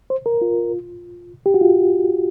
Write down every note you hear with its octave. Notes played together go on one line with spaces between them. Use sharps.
C5
A#4
F4
G4
F#4
F4